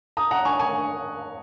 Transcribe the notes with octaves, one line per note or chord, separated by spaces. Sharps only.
A#5 D#6
F#5 A#5
G#5 C#6
G#5 C#6